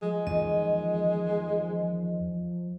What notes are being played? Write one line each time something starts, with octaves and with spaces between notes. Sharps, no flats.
F3 G#3
E2 D#3 D#5